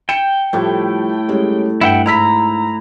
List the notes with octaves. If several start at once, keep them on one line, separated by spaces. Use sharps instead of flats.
G5 C#7 E7
A2 F3 G3 A3
G3 G#3 C#4
G2 E4 F#5 G5
G#2 E4 A#5 E6 B6